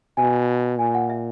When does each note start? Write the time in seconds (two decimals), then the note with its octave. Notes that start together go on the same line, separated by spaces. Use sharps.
0.17 B2 G#5
0.78 A#2 G#5
0.94 F#5
1.09 E5